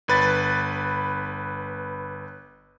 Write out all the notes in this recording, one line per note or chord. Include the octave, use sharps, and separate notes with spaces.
G1 B4 A6